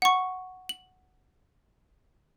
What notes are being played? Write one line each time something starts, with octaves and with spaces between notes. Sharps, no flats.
F#5 C#6
F#7